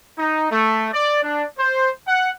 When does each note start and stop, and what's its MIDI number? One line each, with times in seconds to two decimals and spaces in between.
0.19 0.50 63
0.52 0.88 57
0.93 1.20 74
1.23 1.45 62
1.59 1.90 72
2.08 2.30 78